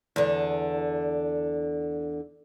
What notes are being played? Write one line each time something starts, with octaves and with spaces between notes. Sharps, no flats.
E2 D3